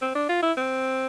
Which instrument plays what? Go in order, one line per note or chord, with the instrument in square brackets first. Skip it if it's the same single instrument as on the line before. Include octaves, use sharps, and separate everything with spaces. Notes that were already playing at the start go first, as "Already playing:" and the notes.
[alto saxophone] C4
D4
F4
E4
C4